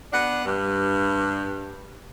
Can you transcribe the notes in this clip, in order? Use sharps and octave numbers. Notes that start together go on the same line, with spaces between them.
B3 D4 F#5
G2